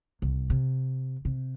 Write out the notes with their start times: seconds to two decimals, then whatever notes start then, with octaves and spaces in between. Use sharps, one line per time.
0.22 C2
0.50 C3
1.25 C3